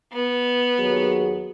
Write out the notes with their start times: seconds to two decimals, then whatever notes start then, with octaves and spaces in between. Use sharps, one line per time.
0.12 B3
0.79 D#2 F#3 G#4